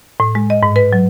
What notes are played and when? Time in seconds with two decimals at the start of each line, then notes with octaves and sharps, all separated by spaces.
0.20 A2
0.35 G#3
0.50 D#5
0.63 G#2
0.76 B4
0.93 F#3